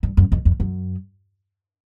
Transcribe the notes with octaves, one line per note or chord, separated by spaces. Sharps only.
G2
F#2
F2
F2
F#2